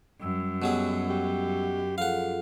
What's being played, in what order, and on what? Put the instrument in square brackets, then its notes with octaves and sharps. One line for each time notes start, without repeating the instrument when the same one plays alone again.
[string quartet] F#2 [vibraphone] G3 E6
[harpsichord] B2 F#3 G#4 [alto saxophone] G4
[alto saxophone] G4
[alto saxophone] F3 [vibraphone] F4 G#4 A4 [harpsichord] F5 F#5